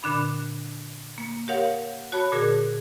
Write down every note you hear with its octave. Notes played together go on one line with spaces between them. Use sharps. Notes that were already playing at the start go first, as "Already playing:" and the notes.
A#2 D3 D4 B5
A#3
G4 A#4 C#5 F5 F#5
F#4 C#5 A5 B5
A#2 D3 G#4 A#4 G#6